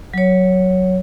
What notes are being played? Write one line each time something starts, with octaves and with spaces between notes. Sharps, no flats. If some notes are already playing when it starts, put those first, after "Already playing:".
F#3 C#5